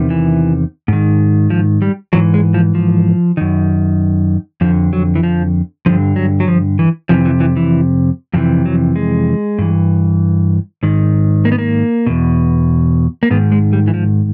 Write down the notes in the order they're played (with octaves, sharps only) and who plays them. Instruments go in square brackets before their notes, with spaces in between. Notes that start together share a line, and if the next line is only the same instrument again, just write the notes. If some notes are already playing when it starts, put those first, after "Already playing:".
Already playing: [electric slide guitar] E2 C3 D#3
E3
G#2 D#3
F3
G3
G#2 E3 F#3
G#3
F3
F3
F#2 D#3
F2 D3 F3
F#3
E3
F3
G2 D3 F3
F#3
F#3
F3
E3
F2 C3 E3 F3
E3
E3
E3
F2 C3 E3 F3
F#3
G#3
G2 E3
G#2 D#3
A#3
B3
A#3
E2 B2
A#3
G#2 D#3 B3
G#3
G3
E3
F3